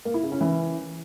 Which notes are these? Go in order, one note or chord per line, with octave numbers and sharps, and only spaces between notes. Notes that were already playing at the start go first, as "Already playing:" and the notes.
A#3
E4
C#3
C#4
E3